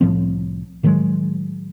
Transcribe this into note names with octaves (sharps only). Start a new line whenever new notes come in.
C2 A2 F3 C4
A2 D#3 F#3 G#3